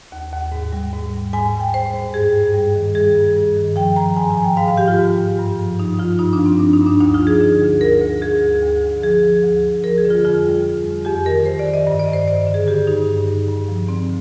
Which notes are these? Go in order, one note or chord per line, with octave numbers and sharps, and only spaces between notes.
D#2
D#2
G#2
G3
G#2
G3
G#2 G#5
G3
G5
G#2 C5
G#2
G2 G#4
G2
G3
D#3
G3 G#4
G2
G2
D#3
F3 G5
F3 A#5
G#2 G#5
G#5
F3
G5
G#2 F5
F5
F3 G4
F4
G#2
G#2
G2
F3
F3 D#4
F3 F4
G2 D#4
D4
F3
C4
G2 D4
D#4
G2
D4
D2 D#4
F4
F3
G#4
D3
D2
D2 A#4
D2
D2 G#4
D2
D2
D3
F3 G#4
F3
D2
D2
F3 A#4
G#4
D3
F4
F2 F4
G3
F2
F2
F2 G4
D#3 A#4
F2 C5
D5
D#3
D#5
G2 D#5
D5
G2
C5
G2 D5
D3
G#4
G2 G4
G2 D#4
G2
G2
G2
F3
D3 C4